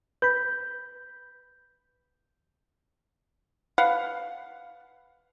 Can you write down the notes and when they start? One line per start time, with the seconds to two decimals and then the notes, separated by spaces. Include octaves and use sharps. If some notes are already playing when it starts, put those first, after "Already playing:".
0.22 B4 B5 G6
3.78 B4 F5 F#5